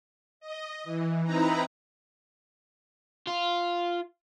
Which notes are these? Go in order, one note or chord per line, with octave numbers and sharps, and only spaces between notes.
D#5
E3
C4 D#4 E4 B4 A#5
F4